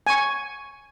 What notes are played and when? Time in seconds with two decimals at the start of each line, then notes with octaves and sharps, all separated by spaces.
0.07 G#5 C#6